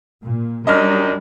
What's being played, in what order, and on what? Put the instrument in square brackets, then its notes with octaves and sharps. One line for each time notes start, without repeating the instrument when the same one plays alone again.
[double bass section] A#2
[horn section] F#2 D4 D#4 [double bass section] G3 [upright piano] D#5 F6